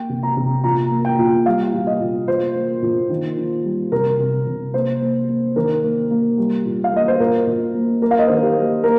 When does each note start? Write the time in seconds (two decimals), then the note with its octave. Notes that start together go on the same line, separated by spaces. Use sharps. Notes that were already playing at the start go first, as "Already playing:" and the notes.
Already playing: A#3 G5
0.09 C3
0.23 A#5
0.37 C3
0.64 A#2 A#5
0.91 A#3
1.05 G5
1.19 A#2
1.46 G3 F5
1.73 A#2
1.87 D#5
2.00 A#2
2.28 A#2 C5
2.55 A#3
2.82 A#2
3.09 D#3
3.37 D#3
3.64 G3
3.92 C3 A#4
4.19 C3
4.46 C3
4.74 A#3 C5
5.01 A#3
5.28 A#3
5.56 D#3 A#4
5.83 A#3
6.11 A#3
6.38 G3
6.65 A#2
6.84 F5
6.93 A#3 D#5
7.08 C5
7.20 A#2 A#4
7.47 A#2
7.74 A#3
8.02 A#3 A#4
8.11 F5
8.19 D#5
8.27 D#3 C5
8.35 A#4
8.43 G4
8.56 A#3
8.84 A#3 A#4